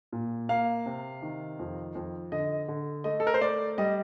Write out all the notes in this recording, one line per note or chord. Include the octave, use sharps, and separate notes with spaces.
A#2
A#3 F5
C3
D#3
F2
F2
D3 D#5
D3
A3 D#5
A4
A#4
C5
A3 D5
G3 D#5